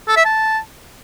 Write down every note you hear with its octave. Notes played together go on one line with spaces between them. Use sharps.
A4
E5
A5